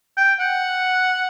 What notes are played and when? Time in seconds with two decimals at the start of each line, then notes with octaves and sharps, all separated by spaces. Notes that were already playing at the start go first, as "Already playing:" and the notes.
0.17 G5
0.40 F#5